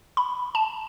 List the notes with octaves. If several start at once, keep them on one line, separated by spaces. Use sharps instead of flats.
B5
A5